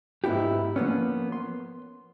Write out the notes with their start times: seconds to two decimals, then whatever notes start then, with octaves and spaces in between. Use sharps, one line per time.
0.24 G#2 B3 E4 F#4 G4
0.76 F3 A#3 B3 C#4
1.32 C6